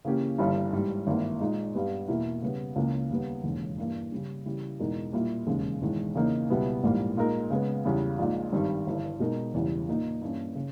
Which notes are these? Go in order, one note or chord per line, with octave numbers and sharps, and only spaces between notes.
C#3 E3 A#3 C#4 G4
G1 G2 E3 G3
G#2 E3 G3
G#1 G2 E3 A#3 E4
A#2 G#3 D#4
G2 G3 B3 G4
E2 B2 A#3 E4 A#4
C#3 G3 B3
C#2 C#3 E3 A#3
D#2 C#3 G3 B3
E1 D#2 C#3 G#3 C#4
G2 E3 A#3
C#3 G3 C#4
C#3 E3 G3
E2 B2 G#3 D#4 A#4
A#2 G3 A#3 E4 G4
E1 D#2 C#3 G#3 C#4
E1 E2 D#3 G#3
E2 C#3 E3 A#3 D#4
C#2 B2 G3 B3 E4
A#1 G#2 E3 G3 A#3
A#2 G#3 D#4 A#4
C#3 G#3 B3
E2 C#3 G3
A#1 A#2 G#3 D#4
G#1 G2 D#3 G3
G1 G2 E3
B2 G#3 D#4 A#4
E1 E2 C#3 E3 G3
A#2 A#3 D#4
G2 E3 A#3 C#4
C#3